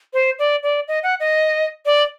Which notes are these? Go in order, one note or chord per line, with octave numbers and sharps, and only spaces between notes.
C5
D5
D5
D#5
F#5
D#5
D5